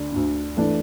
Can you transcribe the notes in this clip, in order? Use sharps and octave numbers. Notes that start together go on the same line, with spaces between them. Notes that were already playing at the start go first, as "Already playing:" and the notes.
Already playing: D2 D3 D4
D2 D3
E3 A3 D4